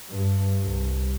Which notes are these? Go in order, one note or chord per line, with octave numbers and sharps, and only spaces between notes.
G2
C2